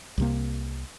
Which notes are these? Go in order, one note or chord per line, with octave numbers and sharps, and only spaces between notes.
C2 C3 A#3